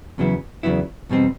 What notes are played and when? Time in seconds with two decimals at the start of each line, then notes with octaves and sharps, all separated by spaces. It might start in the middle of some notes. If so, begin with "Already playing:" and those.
0.18 E2 C#3 F#3 B3 E4
0.63 E2 C#3 F#3 B3 E4
1.09 E2 B2 G3 C4 D#4